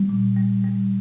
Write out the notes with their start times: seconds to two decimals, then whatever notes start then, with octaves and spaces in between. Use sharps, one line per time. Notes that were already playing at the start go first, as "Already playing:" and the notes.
Already playing: G3
0.09 A#2
0.36 G3
0.64 G3